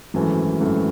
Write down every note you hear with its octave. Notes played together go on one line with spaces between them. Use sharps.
G#1 F#2 E3 A3
G#1 F#2 E3 A3